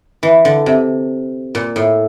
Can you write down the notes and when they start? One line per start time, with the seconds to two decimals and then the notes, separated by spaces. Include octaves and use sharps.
0.23 E3
0.45 D3
0.66 C3
1.55 A#2
1.76 A2